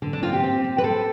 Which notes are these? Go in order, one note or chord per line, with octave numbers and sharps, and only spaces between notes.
D3
D4
C4 F4
G4
C4
C4
B4
C4 A4